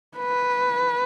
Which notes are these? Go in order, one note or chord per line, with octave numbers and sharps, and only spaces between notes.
B4